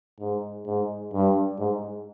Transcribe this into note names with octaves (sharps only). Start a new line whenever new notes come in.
G#2
G#2
G2
G#2